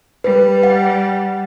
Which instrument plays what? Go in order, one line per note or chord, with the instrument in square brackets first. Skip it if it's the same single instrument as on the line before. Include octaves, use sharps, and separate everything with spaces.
[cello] G3 [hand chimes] B4
[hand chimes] F#5